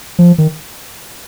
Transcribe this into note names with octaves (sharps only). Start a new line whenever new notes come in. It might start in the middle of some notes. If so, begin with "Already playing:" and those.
F3
D#3